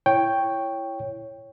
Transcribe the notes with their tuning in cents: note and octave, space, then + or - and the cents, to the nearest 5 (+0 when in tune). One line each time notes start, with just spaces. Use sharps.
E4 +20 C#5 +0 G5 +0